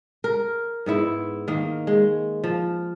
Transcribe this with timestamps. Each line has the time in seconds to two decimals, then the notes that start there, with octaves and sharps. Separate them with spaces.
0.24 A#4
0.86 G#2 B3 E4
1.48 D#3 A#3
1.87 G#3
2.44 F3